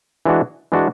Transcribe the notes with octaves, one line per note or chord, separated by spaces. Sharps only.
E3 G#3 D4 F#4
E3 G#3 D4 F#4